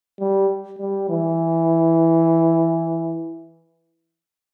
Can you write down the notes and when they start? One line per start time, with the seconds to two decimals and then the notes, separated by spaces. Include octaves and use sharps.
0.20 G3
0.79 G3
1.09 E3